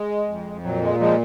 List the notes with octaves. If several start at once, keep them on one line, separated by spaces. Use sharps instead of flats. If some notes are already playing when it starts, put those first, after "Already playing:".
Already playing: G#3
F2
A#2 F#3
G#3
F3 G#3